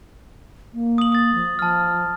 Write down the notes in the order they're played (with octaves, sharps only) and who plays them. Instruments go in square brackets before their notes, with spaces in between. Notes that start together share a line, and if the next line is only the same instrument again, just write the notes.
[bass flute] A#3
[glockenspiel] D#6 F#7
D#6 A6
[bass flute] F3
[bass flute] F3 [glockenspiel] A5 F6